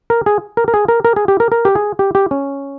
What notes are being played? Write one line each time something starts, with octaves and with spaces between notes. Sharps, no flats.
A#4
G#4
A#4
A#4
G#4
A#4
A#4
G#4
G4
A#4
A#4
G4
G#4
G4
G4
C#4